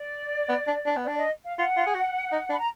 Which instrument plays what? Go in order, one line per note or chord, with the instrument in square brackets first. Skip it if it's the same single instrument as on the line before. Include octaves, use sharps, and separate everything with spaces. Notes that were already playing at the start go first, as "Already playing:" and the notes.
Already playing: [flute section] D5
[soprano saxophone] B3
D4
D4
B3
[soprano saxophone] D4 [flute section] D5
[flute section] D#5
F5
[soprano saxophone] F4 [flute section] F#5
[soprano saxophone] F4
G#4
F#4
D#4
[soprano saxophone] D4 [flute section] B5
[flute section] A#5